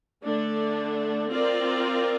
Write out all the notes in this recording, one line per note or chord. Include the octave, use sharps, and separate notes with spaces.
D3 A3 D4
C4 F4 A#4 D5